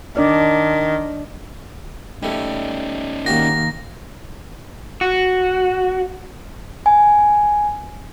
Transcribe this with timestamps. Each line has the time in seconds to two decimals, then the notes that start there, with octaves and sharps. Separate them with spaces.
0.17 D#3 D4 D5
2.23 G3 A3 C#4 D#4
3.26 D#3 A#3 F#4 G4 A#6
5.01 F#4
6.86 G#5